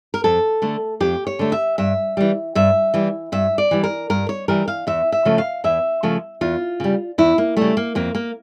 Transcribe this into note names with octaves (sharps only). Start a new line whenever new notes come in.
A#4
F2 A4
D3 A3
F2 G4
C#5
D3 A3
E5
G2 E5
E3 G3
G2 E5
E3 G3
G2 E5
D5
E3 G3
A#4
G2 A#4
C#5
E3 G3 A#4
F5
E2 E5
E5
C#3 F3 A3
F5
E2 E5
C#3 F3 A3
E2 F4
C#3 G3
E2 E4
A#3
C#3 G3 A3
A#3
F2 A#3
A#3